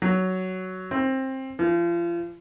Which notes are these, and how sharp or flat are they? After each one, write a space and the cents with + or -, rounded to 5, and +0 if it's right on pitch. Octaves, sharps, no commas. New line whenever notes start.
F#3 +10
C4 +20
F3 -35